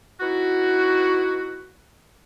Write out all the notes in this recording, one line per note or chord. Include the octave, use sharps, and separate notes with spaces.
B3 D#4 E4 F#4